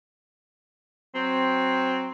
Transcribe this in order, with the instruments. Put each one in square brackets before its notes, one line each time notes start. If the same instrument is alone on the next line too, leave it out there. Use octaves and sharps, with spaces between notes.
[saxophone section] F#3 C4